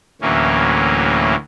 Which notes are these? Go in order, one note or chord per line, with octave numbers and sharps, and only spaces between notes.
D2 A2 E3 F#3 A#3 C#4